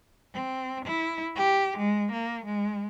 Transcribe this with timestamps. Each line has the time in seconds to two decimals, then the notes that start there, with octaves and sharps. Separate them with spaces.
0.33 C4
0.85 E4
1.36 G4
1.77 G#3
2.12 A#3
2.45 G#3